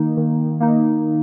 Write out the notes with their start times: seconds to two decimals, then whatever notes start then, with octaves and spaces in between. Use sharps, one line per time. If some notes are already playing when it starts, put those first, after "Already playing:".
Already playing: D#3 A#3 D#4
0.17 D#3
0.60 A#3 D#4